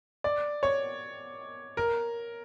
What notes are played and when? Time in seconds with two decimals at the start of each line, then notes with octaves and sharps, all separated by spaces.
0.24 D5
0.63 C#5
1.77 A#4